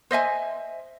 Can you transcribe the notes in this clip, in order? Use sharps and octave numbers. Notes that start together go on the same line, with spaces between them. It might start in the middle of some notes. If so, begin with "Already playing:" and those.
C5 D#5 E5 G#5